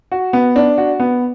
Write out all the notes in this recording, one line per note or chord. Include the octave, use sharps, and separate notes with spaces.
F#4
B3
D4
F#4
B3